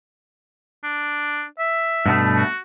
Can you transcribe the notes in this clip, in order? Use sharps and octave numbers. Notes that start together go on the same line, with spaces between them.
D4
E5
G2 B2 A3
F#4